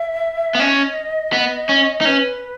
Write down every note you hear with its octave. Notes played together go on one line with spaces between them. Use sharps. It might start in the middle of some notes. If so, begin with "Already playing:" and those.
Already playing: E5
B3
C#4 D#5
B3
C#4
D#4
C#4 B4